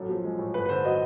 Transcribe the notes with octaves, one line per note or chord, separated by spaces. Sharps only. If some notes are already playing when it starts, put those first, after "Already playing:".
Already playing: A1 F#2 A4
F3
G#3
A2
G1 B4
B4
D3 C5
F#3 D#5